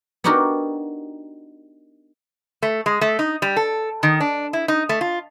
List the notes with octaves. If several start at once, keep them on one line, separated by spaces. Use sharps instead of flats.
B3 D4 D#4 F#4 G4 A#4
A3
G#3
A3
D#4
G3
A4
D#3
D4
E4
D#4
A3
F4